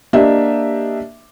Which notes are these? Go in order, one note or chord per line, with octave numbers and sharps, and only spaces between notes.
A#3 D4 G4 D#5 E5